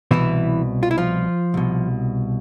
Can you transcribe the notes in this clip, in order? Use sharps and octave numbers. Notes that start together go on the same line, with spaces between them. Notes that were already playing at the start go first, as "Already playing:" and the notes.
C2 B2 E3 E4
F4
E4
F3 F4
C2 B2